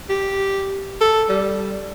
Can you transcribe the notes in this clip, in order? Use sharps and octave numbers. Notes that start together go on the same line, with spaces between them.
G4
A4
G3